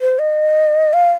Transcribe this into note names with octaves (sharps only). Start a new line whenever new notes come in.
C5
D#5
F5